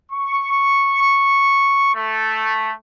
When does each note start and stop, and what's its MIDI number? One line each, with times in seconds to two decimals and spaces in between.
0.11 1.91 85
1.94 2.71 57